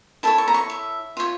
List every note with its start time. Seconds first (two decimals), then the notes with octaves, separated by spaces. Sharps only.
0.23 E4 A4 C#5 A5
0.38 C#6
0.48 A#5
0.54 C#6
0.70 E5
1.17 F4 C#5